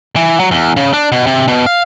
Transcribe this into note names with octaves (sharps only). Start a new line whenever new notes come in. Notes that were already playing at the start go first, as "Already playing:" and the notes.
E3
F#3
E2
C#3
D4
B2
C3
B2
F5